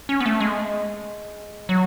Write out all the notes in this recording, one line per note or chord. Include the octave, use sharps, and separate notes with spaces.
C#4
B3
A3
G#3
F#3